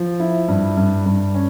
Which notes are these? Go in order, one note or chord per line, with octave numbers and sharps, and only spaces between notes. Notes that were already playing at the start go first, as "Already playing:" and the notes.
Already playing: F3
E4
G2
G2
G2
C#4